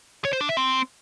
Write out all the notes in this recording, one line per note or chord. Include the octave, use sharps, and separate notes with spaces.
C#5
C5
D4
E5
C4